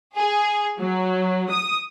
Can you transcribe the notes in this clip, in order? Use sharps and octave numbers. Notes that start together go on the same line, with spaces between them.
G#4
F#3
D#6